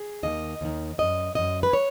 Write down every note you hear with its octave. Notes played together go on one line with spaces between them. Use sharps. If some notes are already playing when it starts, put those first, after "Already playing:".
Already playing: G#4
D#2 D#3 D#5
D#2 D#3
F#2 C#3 D#5
F#2 C#3 D#5
B4
C#5